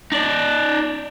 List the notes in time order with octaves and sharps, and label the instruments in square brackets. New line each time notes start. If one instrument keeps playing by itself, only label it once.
[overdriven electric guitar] D#4 D5